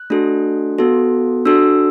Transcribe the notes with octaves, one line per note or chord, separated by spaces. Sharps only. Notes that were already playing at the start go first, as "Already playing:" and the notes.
Already playing: F#6
A3 D4 F#4 A4
B3 F#4 A4
D4 F#4 A4 E6